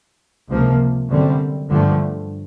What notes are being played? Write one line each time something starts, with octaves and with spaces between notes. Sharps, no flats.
C#2 C3 F3 A#3
F#2 D3 G3 C4
G2 D3 F3 A3